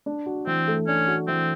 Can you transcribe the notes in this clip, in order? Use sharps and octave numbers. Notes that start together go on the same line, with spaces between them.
D4
F#4
E3 C4
A3
C#4 D4
F#4
E3 C4